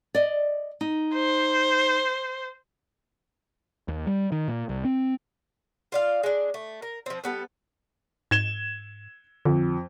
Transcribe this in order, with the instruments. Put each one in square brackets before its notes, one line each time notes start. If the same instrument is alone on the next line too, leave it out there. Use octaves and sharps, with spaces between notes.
[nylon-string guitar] D5 D#5
D#4
[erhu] C5
[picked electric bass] D#2
G3
D#3
A#2
C2
C4
[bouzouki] F4 D5 F5
G#3 D4
A3
A#4
F3 C4
G3 B3 A4
[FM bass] G#2 [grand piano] G#6 E7 G7
[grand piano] F2 [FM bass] D3